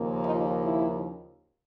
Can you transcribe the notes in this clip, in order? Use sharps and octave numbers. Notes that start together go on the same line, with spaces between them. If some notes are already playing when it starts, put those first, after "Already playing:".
Already playing: D#2 C#3 F3 A#3
D#4 F4
E4